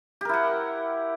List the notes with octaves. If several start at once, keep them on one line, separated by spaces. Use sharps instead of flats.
E4 G4 A#4 F#5